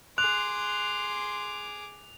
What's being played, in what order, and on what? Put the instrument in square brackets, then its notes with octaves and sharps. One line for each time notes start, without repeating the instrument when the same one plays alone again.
[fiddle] G#4 D6 [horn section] C6 [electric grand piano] F#6 [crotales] F7